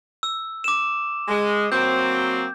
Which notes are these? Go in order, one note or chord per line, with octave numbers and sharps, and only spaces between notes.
E6
D6 E7
G#3
F#3 A#3 C4 G6